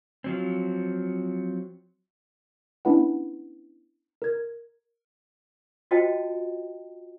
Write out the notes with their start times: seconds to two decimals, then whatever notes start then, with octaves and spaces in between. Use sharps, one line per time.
0.24 F3 F#3 C4
2.85 B3 C#4 D4 E4 B4 F#5
4.22 A#4 G#6
5.91 F4 F#4 C5 D#5 G5 A5